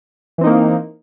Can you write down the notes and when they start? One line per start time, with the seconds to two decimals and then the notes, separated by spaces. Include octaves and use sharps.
0.38 E3
0.41 C4
0.44 D#4
0.46 A#3